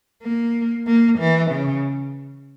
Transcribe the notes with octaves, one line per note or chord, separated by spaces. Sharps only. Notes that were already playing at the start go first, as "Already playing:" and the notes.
A#3
A#3
E3
C#3